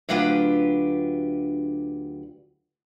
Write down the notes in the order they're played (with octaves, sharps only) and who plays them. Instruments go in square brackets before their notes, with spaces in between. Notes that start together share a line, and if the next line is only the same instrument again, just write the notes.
[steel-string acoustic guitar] D2 F#3 D4 F4 G4 B4